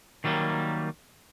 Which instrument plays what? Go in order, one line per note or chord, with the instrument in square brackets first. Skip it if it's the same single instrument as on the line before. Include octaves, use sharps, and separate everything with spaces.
[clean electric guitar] D#3 F#3 G3 A3 A#3